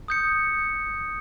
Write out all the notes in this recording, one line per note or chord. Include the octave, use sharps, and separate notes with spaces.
D#6 G6 C#7